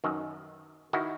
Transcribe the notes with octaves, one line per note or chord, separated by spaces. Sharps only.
F#2 D#3
D#3 E4 F#4